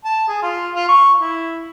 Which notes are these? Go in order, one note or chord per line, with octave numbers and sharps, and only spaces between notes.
A5
G#4
F4
F4
C#6
E4